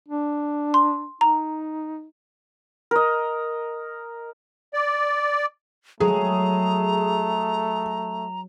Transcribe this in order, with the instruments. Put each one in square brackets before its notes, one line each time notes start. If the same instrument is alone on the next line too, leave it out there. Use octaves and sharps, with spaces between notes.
[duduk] D4
[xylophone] C6
[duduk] D#4 [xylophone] A#5
[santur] A#4 D#5
[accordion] D5
[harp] F#3 G#3 [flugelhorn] A3 [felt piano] G#4 [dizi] A#5